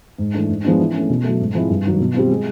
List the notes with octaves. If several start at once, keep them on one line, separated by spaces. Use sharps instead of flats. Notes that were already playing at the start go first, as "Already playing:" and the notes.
G#2
E3 A3 D4
G#2
F3 G#3 B3 D4
E3
A3 C#4
B2
F#3 A3
G#2
F3 G#3 C4 E4
G2
D#3 F#3
B2
G3 C4 F4
G#3